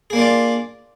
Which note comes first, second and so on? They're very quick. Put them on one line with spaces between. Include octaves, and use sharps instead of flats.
G#4 A#3 D4 F4 D5